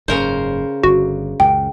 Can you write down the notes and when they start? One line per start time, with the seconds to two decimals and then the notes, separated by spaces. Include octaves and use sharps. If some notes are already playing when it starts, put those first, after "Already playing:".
0.08 F#1 G#2 C#3 A#4 C5
0.83 G1 D3 F#4
1.40 C#2 F#2 A#2 G5